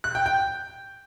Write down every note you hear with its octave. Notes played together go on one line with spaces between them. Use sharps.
F#6
G5
G5